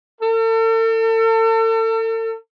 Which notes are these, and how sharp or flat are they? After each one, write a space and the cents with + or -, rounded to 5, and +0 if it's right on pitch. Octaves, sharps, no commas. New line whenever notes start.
A4 +40